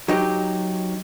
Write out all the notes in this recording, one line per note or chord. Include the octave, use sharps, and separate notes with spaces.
F#3 D#4 G4